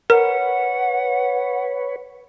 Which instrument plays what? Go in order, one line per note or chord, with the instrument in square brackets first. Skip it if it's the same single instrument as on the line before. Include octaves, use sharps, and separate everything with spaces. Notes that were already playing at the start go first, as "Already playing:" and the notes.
[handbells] A#4 [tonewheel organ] B4 C#5 [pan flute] F#5